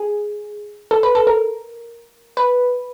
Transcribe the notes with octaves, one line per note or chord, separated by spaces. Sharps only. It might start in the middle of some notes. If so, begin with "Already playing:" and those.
Already playing: G#4
A4
B4
A4
A#4
B4